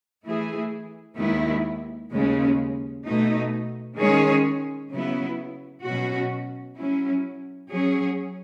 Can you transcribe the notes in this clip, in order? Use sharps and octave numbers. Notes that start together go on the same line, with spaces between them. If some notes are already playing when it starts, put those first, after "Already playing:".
E3 A3 E4 G#4
D#2 D#3 G#3 B3 E4
D#2 C#3 G#3 C#4
B2 A3 D#4
D#3 G#3 C#4 G#4 C#5
C#3 F#3 B3 E4
B2 F#3 C#4 F#4
F#3 C#4 E4
F#3 C#4 G#4 C#5